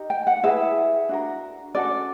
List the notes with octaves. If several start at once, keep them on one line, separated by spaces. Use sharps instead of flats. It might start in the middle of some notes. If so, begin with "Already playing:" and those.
Already playing: D#4 G4 A#4
G5
F#5
E4 G#4 B4 E5
D4 F#4 A#4
C#4 F#4 A4 D5